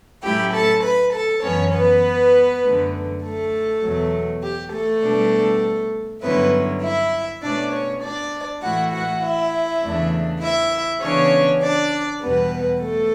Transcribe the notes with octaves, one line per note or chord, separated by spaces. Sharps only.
A2 F#3 A3 C#4 E4 G4 G5
A4 A5
B4 B5
A4 A5
F#2 E3 B3 C#4 C#5
B3 B4
F#2 D3 A3
A3 A4
E2 B2 F#3 A3
G4
A3 A4
B2 G3 D4
G2 D3 F#3 B3 C#4 E4 B4
E4 E5
B2 A3 C#4 D4 D5
C#4 C#5
D4 D5
A2 E3 A3 E4 F#4 F#5
F#4 F#5
E4 E5
E2 C#3 E3 A3 D4
E4 E5
C#3 E3 B3 C#4 D4 C#5
D4 D5
E2 B2 G3 B3 B4
A3 A4